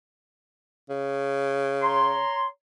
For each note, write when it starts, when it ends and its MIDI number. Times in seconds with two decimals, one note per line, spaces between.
0.89 2.21 49
1.82 2.46 73
1.82 2.46 82
1.82 2.46 84